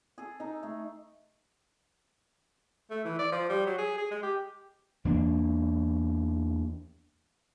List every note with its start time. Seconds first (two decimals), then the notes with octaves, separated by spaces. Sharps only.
0.18 G#4 A4
0.40 D#4 A4
0.63 A3 G#4
2.91 A3
3.05 E3
3.19 D5
3.32 F3
3.49 G3
3.67 F#3
3.78 G#4
3.98 G#4
4.11 G#3
4.23 G4
5.05 E2 A#3 D4